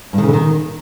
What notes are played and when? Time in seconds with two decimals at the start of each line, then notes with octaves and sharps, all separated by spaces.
0.13 G2
0.18 D#3
0.23 C#3
0.28 D3
0.33 D#3